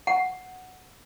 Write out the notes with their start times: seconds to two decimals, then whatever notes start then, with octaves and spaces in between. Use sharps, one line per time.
0.07 F#5